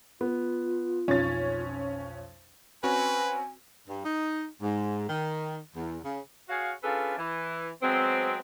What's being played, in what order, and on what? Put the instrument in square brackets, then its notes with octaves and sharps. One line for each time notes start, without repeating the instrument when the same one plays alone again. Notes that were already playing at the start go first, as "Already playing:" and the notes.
[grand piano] B3 [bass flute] F4
[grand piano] B1 F2 [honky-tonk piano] C#4 A6
[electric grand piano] C4 C#4 F#4 [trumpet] B4 [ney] G#5
[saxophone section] G2
D#4
G#2
D#3
E2
C#3
F#4 G#4 C#5 F5
C#4 D4 F4 G#4 A4 B4
E3
F#3 G#3 B3 C4